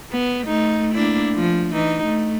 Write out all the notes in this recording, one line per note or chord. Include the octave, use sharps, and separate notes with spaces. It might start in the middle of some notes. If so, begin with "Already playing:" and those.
B3
A3 D#4
A#3 D4 E4
F3
E3 D#4
A3